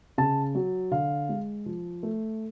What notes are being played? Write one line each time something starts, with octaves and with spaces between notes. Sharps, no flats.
C#3 A5
F#3
D3 F5
G#3
F3
A3